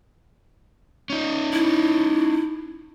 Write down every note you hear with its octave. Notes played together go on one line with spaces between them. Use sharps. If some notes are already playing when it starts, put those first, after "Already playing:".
C#4 D#4
E4